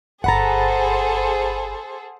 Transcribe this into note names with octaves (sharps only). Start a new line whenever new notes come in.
G1 G#4 A4 C5 F#5 A#5 B5 A6